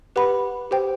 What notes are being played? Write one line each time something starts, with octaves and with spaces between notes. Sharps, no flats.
G4 B4 F#5 B5
G4 C5 G5